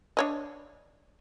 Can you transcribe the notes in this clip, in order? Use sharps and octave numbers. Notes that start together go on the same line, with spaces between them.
D4 C#5 D#5